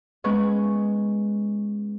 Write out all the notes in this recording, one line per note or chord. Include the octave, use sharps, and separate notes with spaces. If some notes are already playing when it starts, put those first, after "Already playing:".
G#3 B3 C#4 C#5